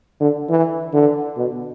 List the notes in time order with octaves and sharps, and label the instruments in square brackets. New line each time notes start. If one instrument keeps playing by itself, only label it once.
[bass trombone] D3
E3
D3
B2